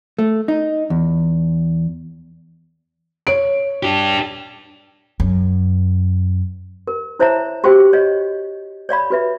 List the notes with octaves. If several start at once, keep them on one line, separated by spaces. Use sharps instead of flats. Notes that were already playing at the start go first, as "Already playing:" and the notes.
A3
D#4
E2
C#5 D7
D4 G4
F#2
A#4
E4 C5 C#5 E5 A5 A#5
F#4 G4 C5 F5 G5
C#5 D#5 F5
C#5 D5 F5 B5
F#4 B4 E5